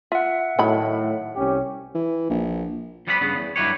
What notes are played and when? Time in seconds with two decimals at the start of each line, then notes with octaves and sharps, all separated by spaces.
0.12 F4 E5 F#5
0.59 A2 D#3 F#3 B5
1.36 C2 C#4 G4
1.94 E3
2.30 A#1
3.07 F3 G3 B3 C4 F5 B5
3.21 G2 C#3 B3
3.35 E2
3.56 G2 F#3 E4 G4 B4 C#5